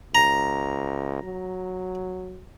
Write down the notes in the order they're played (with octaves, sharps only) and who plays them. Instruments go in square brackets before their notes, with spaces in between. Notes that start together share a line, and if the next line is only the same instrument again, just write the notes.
[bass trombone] C#2 [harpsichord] A#5
[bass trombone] F#3